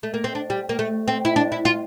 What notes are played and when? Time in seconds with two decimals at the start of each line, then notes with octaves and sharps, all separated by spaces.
0.03 A3
0.14 A#3
0.24 C4
0.35 D4
0.50 G3
0.69 A#3
0.79 A3
1.08 C4
1.25 E4
1.36 D4
1.52 E4
1.65 F4